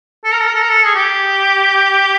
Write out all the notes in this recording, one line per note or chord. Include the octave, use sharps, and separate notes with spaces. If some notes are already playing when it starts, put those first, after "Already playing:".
A4
A#4
A4
A#4
A4
A#4
A4
G#4
G4